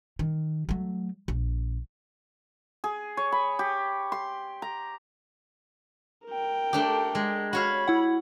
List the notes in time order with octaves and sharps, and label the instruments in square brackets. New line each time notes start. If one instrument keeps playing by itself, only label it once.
[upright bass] D#3
F#3 A3
A#1
[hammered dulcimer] G#4
C#5
B5
G4
C6
A#5
[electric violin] A#4 G5
[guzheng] A3 D4 G4
G#3
[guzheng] F#4 C#5 F5 [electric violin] B5
[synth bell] E4 F#5